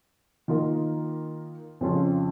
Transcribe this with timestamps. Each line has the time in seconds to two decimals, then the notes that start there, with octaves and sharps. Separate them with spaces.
0.48 D#3 A#3 F4 A#4 D#5
1.81 F2 C#3 G#3 C#4 F4